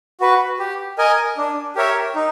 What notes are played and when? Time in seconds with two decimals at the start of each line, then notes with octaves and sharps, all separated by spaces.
0.21 F#4 B4
0.59 G4
0.98 A#4 D#5 G#5
1.37 D4
1.76 G4 A#4 C#5 E5
2.15 D#4